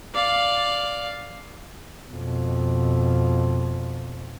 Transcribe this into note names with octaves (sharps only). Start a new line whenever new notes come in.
D5 F5
F2 B2